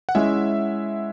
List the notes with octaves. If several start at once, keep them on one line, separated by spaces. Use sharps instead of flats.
F#5
G#3 C#4 E4 E5